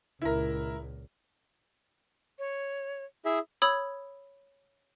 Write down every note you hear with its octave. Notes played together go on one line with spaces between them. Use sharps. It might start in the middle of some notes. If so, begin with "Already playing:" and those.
C#2 A#2 E4 A#4
C#5
E4 G#4 E5 D#6
C#5 B5 D#6 E6 G#6